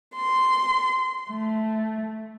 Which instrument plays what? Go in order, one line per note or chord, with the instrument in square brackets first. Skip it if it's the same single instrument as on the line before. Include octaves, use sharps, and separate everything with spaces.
[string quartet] C6
A3